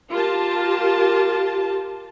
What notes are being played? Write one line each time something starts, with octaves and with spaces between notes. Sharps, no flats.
F4 G4 A#4 A5